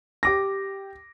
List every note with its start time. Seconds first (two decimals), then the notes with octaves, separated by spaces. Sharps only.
0.23 G4 D6 A#6